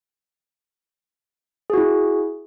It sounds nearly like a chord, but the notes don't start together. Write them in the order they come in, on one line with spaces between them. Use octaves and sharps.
G#4 F#4 E4